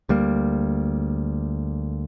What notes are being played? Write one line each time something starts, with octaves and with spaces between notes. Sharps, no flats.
D2 G3 A#3